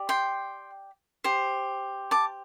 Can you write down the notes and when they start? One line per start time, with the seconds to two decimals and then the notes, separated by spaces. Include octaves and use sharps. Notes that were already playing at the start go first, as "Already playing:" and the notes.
Already playing: G4 D5
0.09 G5 C6
1.24 G4 C5
2.11 A5 D6